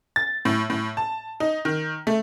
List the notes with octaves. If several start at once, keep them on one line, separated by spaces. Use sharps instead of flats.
A6
A2
A2
A5
D#4
D#3
A3